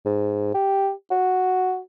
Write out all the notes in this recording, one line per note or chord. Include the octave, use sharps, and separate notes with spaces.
G#2
G4
F#4